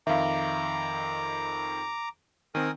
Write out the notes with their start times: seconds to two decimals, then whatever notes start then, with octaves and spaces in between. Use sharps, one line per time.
0.07 F2 D#3 E5 F5 A#5 D6
2.55 D#3 C4 A#4 G#5 D#6